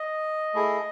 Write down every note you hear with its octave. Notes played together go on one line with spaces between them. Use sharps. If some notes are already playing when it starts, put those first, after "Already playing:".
Already playing: D#5
A3 E4 G#4